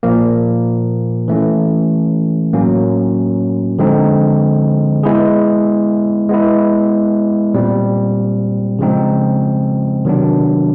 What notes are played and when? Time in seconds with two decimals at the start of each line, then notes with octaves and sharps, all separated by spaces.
0.03 A#2 F3 A#3
1.28 E3 A3 C#4
2.53 A2 F#3 A#3 C#4
3.79 D3 F3 G#3 C4 D#4
5.03 G#3 B3 E4 G#4
6.29 G#3 B3 E4
7.54 A#2 G3 C4
8.79 C#3 F3 G#3 C4 D#4
10.05 C3 D#3 F#3 B3 D4